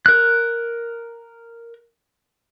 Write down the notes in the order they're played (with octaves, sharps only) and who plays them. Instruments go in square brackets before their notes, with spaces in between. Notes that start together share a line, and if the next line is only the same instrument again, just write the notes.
[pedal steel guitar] A#4 F#6